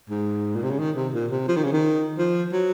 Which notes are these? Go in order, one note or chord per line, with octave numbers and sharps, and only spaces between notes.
G#2
A#2
C3
C#3
D#3
C3
A#2
C3
F3
D#3
C#3
D#3
F3
F#3